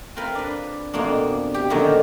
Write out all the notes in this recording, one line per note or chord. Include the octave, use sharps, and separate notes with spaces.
C4 F4 A#4 B4
D4 B4
F2 B2 A#3 D4
G4
F#2 A#2 D3 D#3 F3 F#3